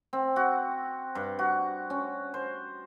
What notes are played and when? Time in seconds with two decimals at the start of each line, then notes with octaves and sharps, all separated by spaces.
0.13 C4
0.36 F#4
1.15 G2
1.39 F#4
1.90 C#4
2.34 C5